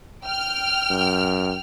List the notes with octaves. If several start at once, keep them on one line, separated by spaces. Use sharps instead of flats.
G5 F6
F#2